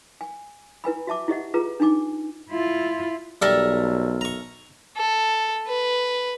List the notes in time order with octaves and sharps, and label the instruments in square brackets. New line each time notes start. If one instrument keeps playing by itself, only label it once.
[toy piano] G#5
E4 B4 G#5 B5
F#4 E5 A5 D6
E4 G4 D#5 F#5
F4 G#4 B4 A#5
D4 D#4 G#5 D6
[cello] E4 F4
[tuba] B1 [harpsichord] G3 [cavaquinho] A4 A#4 E5
[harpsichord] A#5 C#6
[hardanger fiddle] A4
B4